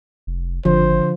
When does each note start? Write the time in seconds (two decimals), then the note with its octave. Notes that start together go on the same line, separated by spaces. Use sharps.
0.27 F1
0.65 G#1 D3 F3 C5